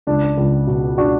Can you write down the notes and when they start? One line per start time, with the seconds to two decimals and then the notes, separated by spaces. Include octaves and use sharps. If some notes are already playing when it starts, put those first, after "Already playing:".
0.07 C#2 D4
0.37 C#2
0.67 B2
0.98 D4 F#4